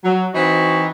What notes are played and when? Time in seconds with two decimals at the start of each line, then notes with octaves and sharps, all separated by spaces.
0.04 F#3
0.34 E3 C4 D#4 F#4